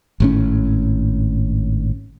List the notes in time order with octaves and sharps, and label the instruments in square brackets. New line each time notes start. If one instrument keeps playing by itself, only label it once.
[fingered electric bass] G#1 A2 C#4